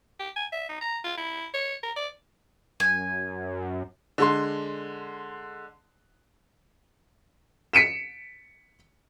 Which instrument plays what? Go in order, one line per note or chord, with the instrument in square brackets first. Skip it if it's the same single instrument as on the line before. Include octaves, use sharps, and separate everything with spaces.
[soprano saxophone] G4
G#5
E5
D#4
A#5
F4
E4
C#5
A#4
D5
[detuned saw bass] F#2 [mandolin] G#5
[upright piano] D3 G#3 C6
B6 C#7 D7 E7